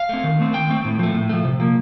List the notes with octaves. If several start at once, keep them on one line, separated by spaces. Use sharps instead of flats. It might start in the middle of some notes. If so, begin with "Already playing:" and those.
Already playing: F5
A3 C4
D#3
A3 C4
D#3 G5
A3 C4
A2
F3 A3
A2
F3 A3
C3
F3 A#3